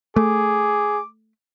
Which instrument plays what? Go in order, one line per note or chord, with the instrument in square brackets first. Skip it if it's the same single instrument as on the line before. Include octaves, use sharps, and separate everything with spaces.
[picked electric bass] A3 [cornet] G#4 [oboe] D6